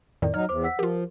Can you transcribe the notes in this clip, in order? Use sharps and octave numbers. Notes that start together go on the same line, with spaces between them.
F2 A2 D#3 D5
F#3 D#4 C#5 F6
E2 C5 D6
F#5 E6 B6
F3 F4 G4 A#4